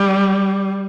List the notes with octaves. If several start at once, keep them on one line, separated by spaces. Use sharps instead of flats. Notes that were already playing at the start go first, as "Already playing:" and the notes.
Already playing: G3